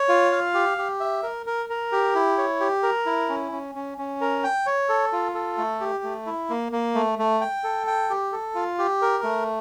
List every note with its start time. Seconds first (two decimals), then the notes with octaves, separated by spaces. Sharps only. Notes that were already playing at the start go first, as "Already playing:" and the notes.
Already playing: C#5
0.09 F4
0.32 F5
0.54 G4
0.78 G4
1.00 E5
1.23 A#4
1.46 A#4
1.70 A#4
1.92 G4
2.15 E4
2.38 C#5
2.60 G4
2.83 A#4
3.06 E4
3.29 C#4
3.52 C#4
3.75 C#4
3.98 C#4
4.21 A#4
4.44 G5
4.66 C#5
4.89 A4
5.13 F4
5.35 A4
5.58 A3
5.81 G4
6.04 A3
6.26 E4
6.50 A#3
6.72 A#3
6.95 A3
7.19 A3
7.41 G5
7.64 A4
7.87 G5
8.10 G4
8.32 A4
8.55 F4
8.79 G4
9.02 A#4
9.24 A3